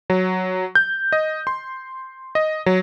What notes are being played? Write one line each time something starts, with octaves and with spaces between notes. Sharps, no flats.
F#3
G6
D#5
C6
D#5
F#3